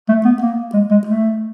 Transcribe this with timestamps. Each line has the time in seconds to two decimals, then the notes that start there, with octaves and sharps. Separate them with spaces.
0.09 A3
0.25 B3
0.42 A#3
0.74 G#3
0.91 G#3
1.07 A3